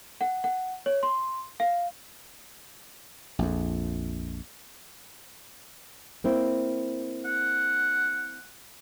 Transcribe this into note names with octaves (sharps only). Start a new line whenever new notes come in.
F#5
F#5
C#5
C6
F5
A#1 F2
A#3 C4 E4
F#5